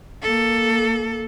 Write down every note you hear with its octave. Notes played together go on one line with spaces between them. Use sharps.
A#3 A4